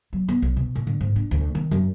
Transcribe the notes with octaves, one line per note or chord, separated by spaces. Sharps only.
F#3
B3
B1
B2
A2
D3
G#2
D4
D2
D#3
F#2